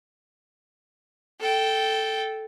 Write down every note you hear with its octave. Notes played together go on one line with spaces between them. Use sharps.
A4 G5